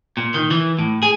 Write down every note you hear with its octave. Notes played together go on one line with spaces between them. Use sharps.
A#2
D#3
E3
A2
G#4